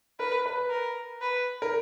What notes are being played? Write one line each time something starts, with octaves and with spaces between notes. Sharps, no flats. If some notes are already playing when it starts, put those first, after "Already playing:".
A#4 B4
B4
A#4
B4
A#4